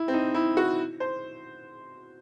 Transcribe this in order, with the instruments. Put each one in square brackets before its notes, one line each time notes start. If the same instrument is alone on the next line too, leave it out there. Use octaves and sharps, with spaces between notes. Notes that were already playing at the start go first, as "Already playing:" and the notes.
Already playing: [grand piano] E4
C4
D#4
E4
F#4
C5